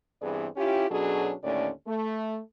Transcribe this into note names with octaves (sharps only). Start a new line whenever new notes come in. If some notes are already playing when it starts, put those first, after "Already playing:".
G2 E3 B3 C4 G#4 D5
C#4 E4 F4 G4
B2 F#3 C#4 D4 G#4 A4
D#2 A2 D3 A3 C#4 D5
A3